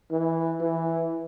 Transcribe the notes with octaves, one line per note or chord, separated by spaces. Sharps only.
E3
E3